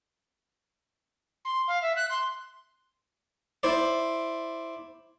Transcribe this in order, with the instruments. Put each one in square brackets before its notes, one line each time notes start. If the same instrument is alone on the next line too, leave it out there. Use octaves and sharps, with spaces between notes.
[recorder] C6
F5
E5
F#6
C6
[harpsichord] E4 C5 D5